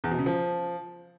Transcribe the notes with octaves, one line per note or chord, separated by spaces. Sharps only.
E2
B2
C#3
F3